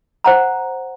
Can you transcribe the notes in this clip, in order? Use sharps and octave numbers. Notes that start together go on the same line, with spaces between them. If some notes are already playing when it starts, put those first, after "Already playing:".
C5 F#5 A#5